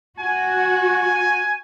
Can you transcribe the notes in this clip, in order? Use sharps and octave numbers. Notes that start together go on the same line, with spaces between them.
F#4 G#5